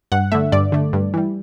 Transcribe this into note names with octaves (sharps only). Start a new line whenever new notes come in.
G2 F#5
D3 A3 E5
G2 D5
D3 A3
G2
E3 G3